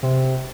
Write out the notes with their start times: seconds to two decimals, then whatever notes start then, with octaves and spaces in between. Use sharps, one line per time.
0.03 C3